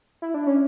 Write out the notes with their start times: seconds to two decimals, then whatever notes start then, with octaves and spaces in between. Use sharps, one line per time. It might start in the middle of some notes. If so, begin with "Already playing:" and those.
0.22 E4
0.34 D4
0.47 C#4